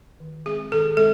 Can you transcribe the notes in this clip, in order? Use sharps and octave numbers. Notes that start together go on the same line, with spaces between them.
D#3
G#3 C4 G#4
D#3 A4
G#3 C4 A4